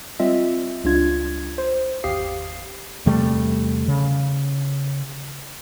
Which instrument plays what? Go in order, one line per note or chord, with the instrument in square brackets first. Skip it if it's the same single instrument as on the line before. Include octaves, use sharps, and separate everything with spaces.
[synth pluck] G3 C4 F4 D#5 E5
C#2 G3 D4 F4 G#6
C5
G#1 E2 G4 F5 D#6 C7
[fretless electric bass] E2 C3 G3 A3
C#3